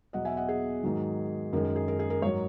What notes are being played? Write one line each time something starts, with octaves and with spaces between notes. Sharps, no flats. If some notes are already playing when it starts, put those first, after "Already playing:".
E2 B2 F#3 D#5 F#5
E5 G#5
D#5 F#5
G#4
G#2 D#3 F#3
F#2 D#3 G#3 A#4
A#4
G#4
A#4
G#4
A#4
G#2 F#3 A#4 C#5